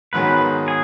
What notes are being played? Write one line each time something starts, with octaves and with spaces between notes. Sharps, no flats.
G#2 D#3 F#3 B3 G#4 B4
G#4